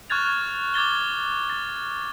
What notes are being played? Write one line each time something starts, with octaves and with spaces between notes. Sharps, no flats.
C#6 F6 F#6 G#6 A6 F7
D6 G#6 A6 G7
A6